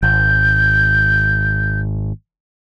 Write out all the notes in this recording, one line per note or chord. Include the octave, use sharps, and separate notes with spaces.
G#1 G6